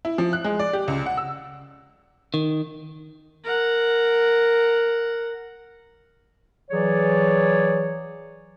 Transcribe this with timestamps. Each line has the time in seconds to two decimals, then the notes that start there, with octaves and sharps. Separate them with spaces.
0.05 E4
0.18 F3
0.33 F#6
0.44 G#3
0.59 D5
0.73 G4
0.88 C#2
1.06 F#5
1.17 E6
2.34 D#3
3.44 A#4 F#5
6.71 E3 F#3 G#4 C#5 D5